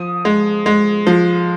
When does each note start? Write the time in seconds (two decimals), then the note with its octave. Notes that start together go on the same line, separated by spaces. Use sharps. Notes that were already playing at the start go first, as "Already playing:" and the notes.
Already playing: F3 D#6
0.25 G#3
0.66 G#3
1.06 F3